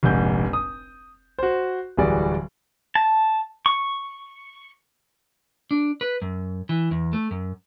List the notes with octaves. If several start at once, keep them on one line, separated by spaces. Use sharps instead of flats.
F1 A#1 G#2 G6
D#6
F#4 C5
D1 E3 G3 F#4 G#4 D5
A5
C#6
D4
B4
F#2
E3
E2
A3
F#2